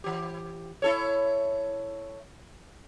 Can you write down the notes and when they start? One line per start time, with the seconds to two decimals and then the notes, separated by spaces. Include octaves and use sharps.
0.04 E3 G4
0.82 E4 A4 C#5